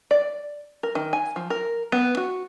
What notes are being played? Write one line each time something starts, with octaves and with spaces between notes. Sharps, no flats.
D5
A#4
D#3
G#5
F3
A#4
B3
F#4